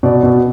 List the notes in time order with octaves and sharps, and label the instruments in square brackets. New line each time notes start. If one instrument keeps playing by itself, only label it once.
[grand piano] B2 D5
B2